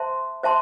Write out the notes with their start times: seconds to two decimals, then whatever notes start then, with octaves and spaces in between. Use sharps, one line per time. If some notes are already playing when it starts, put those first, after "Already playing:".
Already playing: C5 E5 A5 C6
0.43 C5 E5 A5 C6